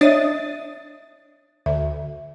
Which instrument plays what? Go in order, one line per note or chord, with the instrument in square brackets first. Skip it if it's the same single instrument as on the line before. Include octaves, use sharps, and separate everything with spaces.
[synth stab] D4 D#6 A6 [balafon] C#5 D#5 E5
[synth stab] D2 [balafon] E5